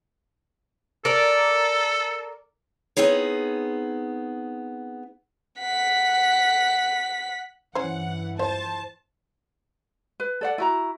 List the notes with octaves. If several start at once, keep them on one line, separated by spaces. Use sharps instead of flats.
A4 A#4 D5
B3 C4 D#4 G#4 C#5
F#5 B6
G2 E3 C#4 C5 F#5
F3 C5 A5
B4
A4 D5 F#5
E4 F#4 A#5